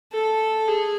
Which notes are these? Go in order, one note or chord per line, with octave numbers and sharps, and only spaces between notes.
A4
G#4